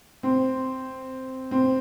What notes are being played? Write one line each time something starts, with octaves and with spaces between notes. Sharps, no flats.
C4
C4